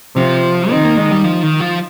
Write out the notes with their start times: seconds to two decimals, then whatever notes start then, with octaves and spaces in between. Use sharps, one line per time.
0.16 C3 F3
0.70 D#3 C4
0.84 A#3
0.97 G#3
1.12 G3
1.24 F3
1.43 D#3
1.60 F3